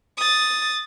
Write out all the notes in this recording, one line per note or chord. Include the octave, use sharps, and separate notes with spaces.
D#6 A6